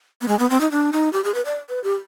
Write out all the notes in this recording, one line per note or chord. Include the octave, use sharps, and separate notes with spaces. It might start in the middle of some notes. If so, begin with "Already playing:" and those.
B3
G#3
B3
C4
D#4
D4
D#4
G4
G#4
B4
D5
B4
G4